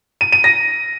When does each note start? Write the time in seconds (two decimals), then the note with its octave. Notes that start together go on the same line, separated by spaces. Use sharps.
0.21 D#7
0.32 D#7
0.44 A#6